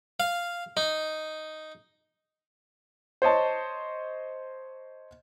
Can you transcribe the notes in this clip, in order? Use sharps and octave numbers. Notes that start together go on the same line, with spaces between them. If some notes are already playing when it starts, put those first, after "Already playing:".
F5
D#4
C5 C#5 D#5 A5